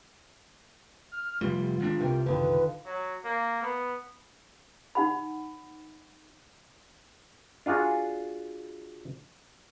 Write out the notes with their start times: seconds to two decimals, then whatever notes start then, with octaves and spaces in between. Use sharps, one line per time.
1.12 F6
1.41 F1 G3 F4
1.80 G#1 G#2 D4
2.00 C2 C3 A#4 G5
2.26 F#1 D3 D#3 F4 B4
2.86 F#3
3.25 A#3
3.63 B3
4.95 D#4 F#5 B5
7.66 D4 F4 F#4 G#4